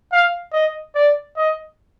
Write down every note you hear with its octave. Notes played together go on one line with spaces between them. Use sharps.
F5
D#5
D5
D#5